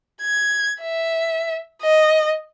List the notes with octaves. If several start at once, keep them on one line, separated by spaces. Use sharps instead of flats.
G#6
E5
D#5